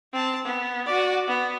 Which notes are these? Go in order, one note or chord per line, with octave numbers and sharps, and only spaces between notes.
C4 A5
B3
F#4 D5
B3